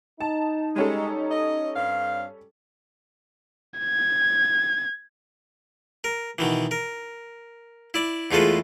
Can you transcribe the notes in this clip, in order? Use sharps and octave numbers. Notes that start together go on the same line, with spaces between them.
D#4 A5
G3 G#3 C#4 A4
D#5
G2 C4 F5
G#6
A#4
B2 D#3 E3
A#4
E4 D5
E2 G#3 A3 F4 A4 B4